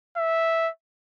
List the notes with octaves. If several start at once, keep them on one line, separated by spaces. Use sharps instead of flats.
E5